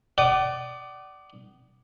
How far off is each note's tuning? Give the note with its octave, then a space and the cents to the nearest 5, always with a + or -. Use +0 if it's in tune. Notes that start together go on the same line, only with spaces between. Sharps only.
D5 +0 F#5 +40 D#6 -20